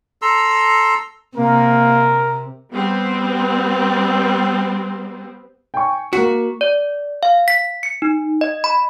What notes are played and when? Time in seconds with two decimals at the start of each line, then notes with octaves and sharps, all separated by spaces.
0.22 A4 A#5 C6 E6
1.37 C3 A#3 A#4
2.73 G3 B3 C4
5.74 G5 G#5 C#6
6.13 A#3 F#4 B6
6.61 D5
7.23 F5
7.48 B6
7.83 C#7
8.02 D#4
8.41 D#5
8.64 B5